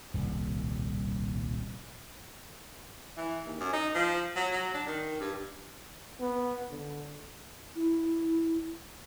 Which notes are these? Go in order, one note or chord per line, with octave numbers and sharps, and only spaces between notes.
D#1 C2 A2
E3
D#2
F#2
D#4
F3
F#3
F#3
D4
D#3
G2
B3
D3
E4